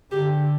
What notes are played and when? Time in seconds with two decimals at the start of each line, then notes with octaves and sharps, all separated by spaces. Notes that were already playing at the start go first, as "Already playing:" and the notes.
0.11 D3 G4